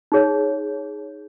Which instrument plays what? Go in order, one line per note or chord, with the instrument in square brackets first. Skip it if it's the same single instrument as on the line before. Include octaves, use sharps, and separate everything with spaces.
[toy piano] D#4 G#4 C#5